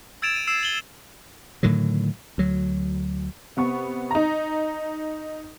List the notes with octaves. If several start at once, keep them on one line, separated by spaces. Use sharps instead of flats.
E6 G#6 A6 D7 E7 F7
D#7
E6 C7 E7
F#7 G7
A2 D3 D#3 F#3
D2 F#3
C3 B3 C#6
D#4 A#5